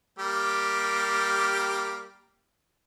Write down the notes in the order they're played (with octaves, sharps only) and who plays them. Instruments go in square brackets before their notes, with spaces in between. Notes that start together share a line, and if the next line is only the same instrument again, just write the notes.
[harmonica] G3 A#3 G4